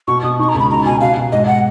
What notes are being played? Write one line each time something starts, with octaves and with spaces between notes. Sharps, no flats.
B2 C#6
B2 D#6
D#4 C#6
A#5
C#2
B5
B2 A#5
B2 G#5
F#4 F5
B2
G#2 D#5
F#5